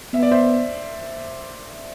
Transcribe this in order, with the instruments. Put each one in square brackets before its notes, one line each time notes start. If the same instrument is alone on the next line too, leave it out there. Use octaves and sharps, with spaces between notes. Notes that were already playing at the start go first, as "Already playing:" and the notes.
[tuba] B3 [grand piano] E5
[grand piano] D5
C5 E5